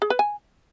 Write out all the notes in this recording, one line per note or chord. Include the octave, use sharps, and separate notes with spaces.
G#4
B4
G#5